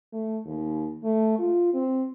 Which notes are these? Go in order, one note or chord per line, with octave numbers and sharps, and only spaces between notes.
A3
D#2
A3
F4
C4